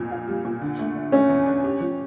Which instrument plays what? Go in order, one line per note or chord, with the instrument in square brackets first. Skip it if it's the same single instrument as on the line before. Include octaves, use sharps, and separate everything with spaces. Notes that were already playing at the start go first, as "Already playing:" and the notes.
Already playing: [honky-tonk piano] F2 A#2
F4
G3
A#2
D3
A3
D4
[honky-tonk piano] A3 [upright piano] C#4
[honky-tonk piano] E2
D4
G4
F3